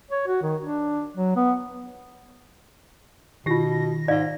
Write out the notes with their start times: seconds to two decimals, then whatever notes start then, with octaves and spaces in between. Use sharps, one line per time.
0.11 C#5
0.27 F#4
0.42 D#3
0.61 D4
1.17 F#3
1.36 B3
3.46 B2 D#3 F4 G4 A#6
4.08 G#2 D5 F5